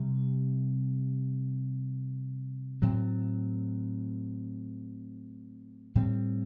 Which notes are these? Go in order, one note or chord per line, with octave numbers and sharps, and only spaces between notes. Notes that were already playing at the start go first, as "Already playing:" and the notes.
Already playing: C3 G3 C4
A2 F#3 C4
A2 G3 C4